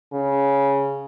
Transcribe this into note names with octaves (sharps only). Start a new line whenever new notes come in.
C#3